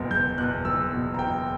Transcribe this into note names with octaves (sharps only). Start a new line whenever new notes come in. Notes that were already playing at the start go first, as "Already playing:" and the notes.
Already playing: F#1 E2 B2
F#1 G6
E2 B2 F#6
F#1 E6
E2 B2
A#5
F#1 G5